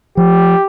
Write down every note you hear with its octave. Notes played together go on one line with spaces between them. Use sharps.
F3 G4